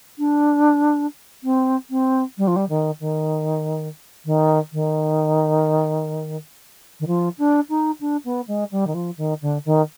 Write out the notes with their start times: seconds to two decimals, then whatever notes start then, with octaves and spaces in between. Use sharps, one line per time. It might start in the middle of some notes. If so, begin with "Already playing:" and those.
0.19 D4
1.44 C4
1.90 C4
2.38 G3
2.47 F3
2.56 G3
2.69 D#3
3.00 D#3
4.25 D#3
4.72 D#3
7.00 D#3
7.07 F3
7.38 D4
7.69 D#4
8.00 D4
8.25 B3
8.48 G#3
8.71 G3
8.87 D#3
8.94 F3
9.17 D#3
9.42 D3
9.65 D#3